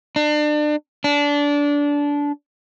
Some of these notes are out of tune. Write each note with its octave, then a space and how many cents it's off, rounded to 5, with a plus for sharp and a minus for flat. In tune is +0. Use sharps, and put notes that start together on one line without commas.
D4 +35
D4 -20